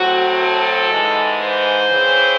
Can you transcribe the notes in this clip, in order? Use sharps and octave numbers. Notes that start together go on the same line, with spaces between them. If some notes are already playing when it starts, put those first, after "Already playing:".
Already playing: A2 F#3 C4 F#4
A4
G#2 E3 G#3
C5
C#3 E3 C4